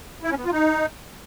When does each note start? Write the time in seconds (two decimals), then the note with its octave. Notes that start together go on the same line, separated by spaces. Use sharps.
0.23 E4
0.30 C#4
0.38 B3
0.45 F4
0.52 D#4